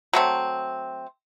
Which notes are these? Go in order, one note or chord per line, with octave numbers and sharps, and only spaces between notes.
F#3 A3 C4